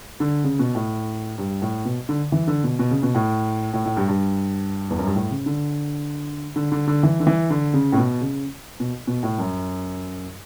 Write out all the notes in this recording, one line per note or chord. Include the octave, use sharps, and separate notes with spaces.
D3
C#3
B2
A2
G2
A2
B2
D3
E3
D3
B2
B2
C#3
B2
A2
A2
A2
G2
G2
E2
F#2
G2
A2
C#3
D3
D3
D3
D3
E3
D3
E3
D3
C#3
A2
B2
C#3
B2
B2
A2
F#2